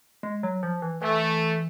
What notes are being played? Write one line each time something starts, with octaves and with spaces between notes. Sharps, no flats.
G#3
F#3
F3
E3
E3 A3